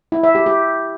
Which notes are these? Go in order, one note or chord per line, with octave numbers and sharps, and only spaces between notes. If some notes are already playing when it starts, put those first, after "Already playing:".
E4
E5
G4
G4